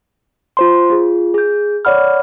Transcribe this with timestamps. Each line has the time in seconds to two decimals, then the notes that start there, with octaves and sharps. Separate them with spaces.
0.57 F4 C5 C6
0.90 F4 G#4
1.34 G#4 G6
1.85 C#5 D5 F#5 B5 F6